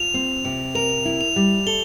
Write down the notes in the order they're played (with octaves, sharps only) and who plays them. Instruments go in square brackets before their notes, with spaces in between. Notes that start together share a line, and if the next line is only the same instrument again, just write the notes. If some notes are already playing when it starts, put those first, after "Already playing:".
Already playing: [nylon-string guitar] F4 [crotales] F7
[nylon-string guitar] C4
C3
[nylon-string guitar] A#4 [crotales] F7
[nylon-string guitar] E4
[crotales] F7
[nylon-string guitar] G3
[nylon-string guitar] A4 [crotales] G7